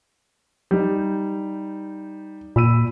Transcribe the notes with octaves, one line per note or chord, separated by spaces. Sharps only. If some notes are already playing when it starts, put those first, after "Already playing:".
G3 D#4
A#2 B5 E6 D#7